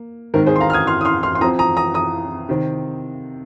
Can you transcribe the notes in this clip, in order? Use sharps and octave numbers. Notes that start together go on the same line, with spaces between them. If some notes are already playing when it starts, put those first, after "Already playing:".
Already playing: A#3
G#2 D#3 C4 A#4
G#4 C5
C6
F5 A#5
F6
D#6 G#6
C6 F6
D#6
C6 F6
C6 F6
C6
F2 F3 C4 A#5 D#6
A#5 D#6
A#5 D#6
A#5 D#6
C3 D#3 C4